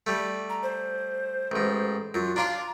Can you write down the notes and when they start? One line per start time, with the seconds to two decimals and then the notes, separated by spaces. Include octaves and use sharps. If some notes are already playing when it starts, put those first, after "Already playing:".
0.07 G3 A3
0.50 A#5
0.63 C5
1.52 A1 G#2
2.14 F#2 F4
2.36 D4 F4 D5 A#5